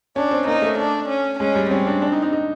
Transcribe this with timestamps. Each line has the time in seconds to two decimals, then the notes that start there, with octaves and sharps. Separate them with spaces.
0.16 C#4 D4
0.31 C4
0.47 A#3 D#4
0.62 A3
0.79 D4
1.09 C#4
1.39 G#3 C#4
1.56 G3
1.71 C4 C#4
1.87 D4
2.02 D4
2.12 D#4
2.22 D#4
2.33 D#4